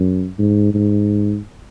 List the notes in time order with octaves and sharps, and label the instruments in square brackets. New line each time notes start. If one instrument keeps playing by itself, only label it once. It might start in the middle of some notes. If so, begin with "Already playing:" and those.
Already playing: [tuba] F#2
G#2
G#2